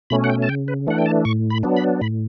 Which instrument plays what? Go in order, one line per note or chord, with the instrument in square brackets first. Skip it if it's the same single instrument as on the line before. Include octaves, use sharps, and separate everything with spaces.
[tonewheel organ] B2 A3 C#4 B5
F#5
G5
A5
C#3 G5
B4
E3 A3 D4 F#5
G5
A5
A2 C#6
B5
F#3 B3 D4
B5
A2 B5